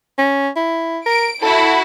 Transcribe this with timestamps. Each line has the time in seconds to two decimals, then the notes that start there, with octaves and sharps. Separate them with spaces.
0.18 C#4
0.56 E4
1.06 A#4 D7
1.42 E4 F#4 A4